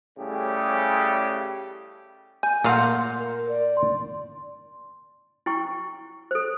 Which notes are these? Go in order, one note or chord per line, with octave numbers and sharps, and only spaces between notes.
A2 C#3 G3 G4 G#4
G#5 G6
A#2 A3 A4 D#5 F5 F#5 C6
A#4
D5
C6
E4 G5 C#6
A4 C5